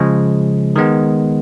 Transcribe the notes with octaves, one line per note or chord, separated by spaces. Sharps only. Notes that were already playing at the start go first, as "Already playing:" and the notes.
Already playing: C#3 F3 G#3
D#3 G#3 B3